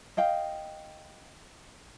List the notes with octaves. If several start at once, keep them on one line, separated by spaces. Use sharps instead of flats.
D#5 F5 G5